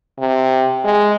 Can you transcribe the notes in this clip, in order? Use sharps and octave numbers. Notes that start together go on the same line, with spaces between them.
C3
G#3